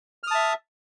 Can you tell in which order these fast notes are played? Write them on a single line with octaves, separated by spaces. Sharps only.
F6 D#6 A5 E5